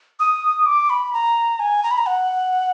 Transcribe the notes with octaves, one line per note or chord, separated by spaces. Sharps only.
D#6
D6
B5
A#5
G#5
A#5
B5
A#5
F#5